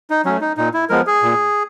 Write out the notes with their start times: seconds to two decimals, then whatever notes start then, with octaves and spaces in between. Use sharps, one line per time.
0.10 D#4
0.25 F#3 A3 C#4
0.41 D#4
0.57 A#2 D#4
0.74 E4
0.90 F3 G#3 B3 A#4
1.07 G#4
1.23 A#2